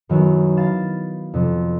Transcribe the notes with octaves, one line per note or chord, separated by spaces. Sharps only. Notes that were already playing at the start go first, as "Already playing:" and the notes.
F#2 D#3 F#3 B3 E4 F#4
F5 B5 A6 E7
F2 C3